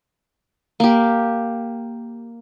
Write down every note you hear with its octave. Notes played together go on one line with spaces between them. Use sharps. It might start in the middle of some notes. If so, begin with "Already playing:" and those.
A#3 G4